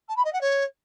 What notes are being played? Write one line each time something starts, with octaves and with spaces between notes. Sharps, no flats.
A5
B5
D#5
F#5
C#5